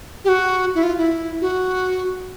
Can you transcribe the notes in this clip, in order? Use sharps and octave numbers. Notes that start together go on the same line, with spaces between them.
G4
F#4
E4
F4
E4
F#4